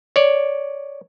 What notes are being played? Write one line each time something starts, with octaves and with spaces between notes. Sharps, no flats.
C#5 D5